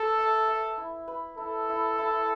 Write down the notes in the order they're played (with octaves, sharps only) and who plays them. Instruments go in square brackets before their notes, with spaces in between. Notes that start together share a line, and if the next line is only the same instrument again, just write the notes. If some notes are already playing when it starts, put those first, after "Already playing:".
Already playing: [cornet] A4 [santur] B4
[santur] E5
E5
E4
B4
[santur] E4 [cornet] A4
[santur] E4
E4